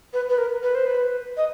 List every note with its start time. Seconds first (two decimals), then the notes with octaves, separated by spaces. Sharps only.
0.14 B4
0.29 B4
0.38 A#4
0.63 B4
0.75 C5
0.86 B4
1.37 D#5